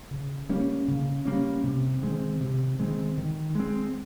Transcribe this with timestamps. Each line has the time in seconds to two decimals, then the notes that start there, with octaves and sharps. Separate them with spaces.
0.11 C#3
0.49 G3 A#3 C#4
0.88 C#3
1.25 G3 A#3 C#4
1.64 C3
2.02 D#3 G#3 C4
2.40 C3
2.79 D#3 G#3 C4
3.17 D#3
3.55 G#3 C4